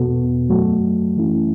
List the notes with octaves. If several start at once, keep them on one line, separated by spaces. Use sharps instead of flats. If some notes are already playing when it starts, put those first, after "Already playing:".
Already playing: E2 B2 B3 F#4 A4
F#2 F#3 A3 F#4 A4
F#2 E3 A3 C#4 E4